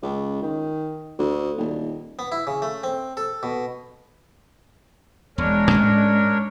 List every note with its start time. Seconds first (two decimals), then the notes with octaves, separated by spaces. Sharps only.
0.02 C#2
0.42 D#3
1.19 D2
1.58 D#1
2.19 B3
2.32 E4
2.47 C#3
2.62 A3
2.83 C4
3.17 A4
3.43 B2
5.38 E1 G#3 D4 A#4 C#5
5.71 G#2 C#4